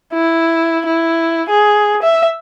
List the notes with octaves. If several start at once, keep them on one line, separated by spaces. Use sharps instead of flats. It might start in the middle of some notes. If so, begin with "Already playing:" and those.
E4
E4
G#4
E5